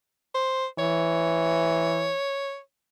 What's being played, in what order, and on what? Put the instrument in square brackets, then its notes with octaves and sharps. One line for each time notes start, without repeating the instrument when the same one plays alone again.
[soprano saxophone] C5
[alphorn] E3 [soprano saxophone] C#5